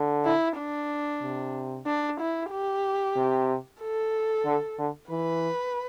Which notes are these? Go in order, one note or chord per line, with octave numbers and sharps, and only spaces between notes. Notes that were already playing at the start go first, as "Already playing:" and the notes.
Already playing: D3
E4
D4
C3
D4
E4
G4
C3
A4
D3
D3
E3 B4